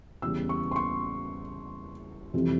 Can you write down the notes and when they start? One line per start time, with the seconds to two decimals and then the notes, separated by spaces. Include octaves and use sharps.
0.22 E2 C#3 G3 E6
0.49 C#6
0.71 C6
0.76 C#6
2.34 F2 C3 E3 G3